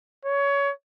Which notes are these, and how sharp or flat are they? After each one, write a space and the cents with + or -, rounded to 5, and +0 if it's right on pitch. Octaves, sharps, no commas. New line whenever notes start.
C#5 +20